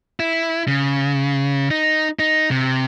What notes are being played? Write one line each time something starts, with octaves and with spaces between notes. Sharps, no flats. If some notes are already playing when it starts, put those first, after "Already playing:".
E4
C#3
D#4
D#4
C3